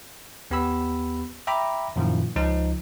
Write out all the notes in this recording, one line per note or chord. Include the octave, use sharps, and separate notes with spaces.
D#2 B3 G4 B5 E6
E5 G5 A#5 B5 D6
F#2 A#2 D#3 F3 E4 F4
C#2 F3 D#4